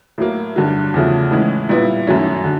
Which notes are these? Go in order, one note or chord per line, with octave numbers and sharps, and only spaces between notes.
A2 F#3 A#3
G2 D3 F#3
E2 C#3 F3 A3
A2 E3 G#3 C#4
A#2 G3 B3 E4
F#2 D#3 F#3 A3 C#4
D3